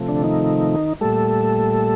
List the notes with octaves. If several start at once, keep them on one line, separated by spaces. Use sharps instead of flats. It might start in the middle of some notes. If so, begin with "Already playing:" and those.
Already playing: C3 F3 A3
D3 D4
D#3 D#4
A#2 G3 A3 A4